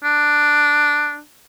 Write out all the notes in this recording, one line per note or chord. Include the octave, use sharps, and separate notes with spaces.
D4